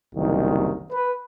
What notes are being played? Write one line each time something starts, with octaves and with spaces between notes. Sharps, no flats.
F#1 C2 D#3
B4